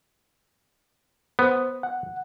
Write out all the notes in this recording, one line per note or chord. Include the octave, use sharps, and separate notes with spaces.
B3 C5
F#5